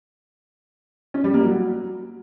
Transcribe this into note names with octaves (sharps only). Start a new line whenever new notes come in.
C#4
G3
A#3
F#3